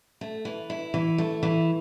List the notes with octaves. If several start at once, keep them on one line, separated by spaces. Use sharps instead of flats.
A3
E3
E4
E3
A3
E3